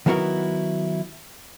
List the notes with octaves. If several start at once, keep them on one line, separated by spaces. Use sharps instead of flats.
D#3 F#3 B3 E4 F#4 A#4